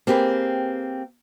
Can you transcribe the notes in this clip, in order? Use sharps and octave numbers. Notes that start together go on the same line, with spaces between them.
A#3 C4 G4 G#4 B4